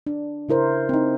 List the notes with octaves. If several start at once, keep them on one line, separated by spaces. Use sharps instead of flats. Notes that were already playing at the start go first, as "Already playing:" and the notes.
D4
C#3 E4 A#4 C5
C4 D#4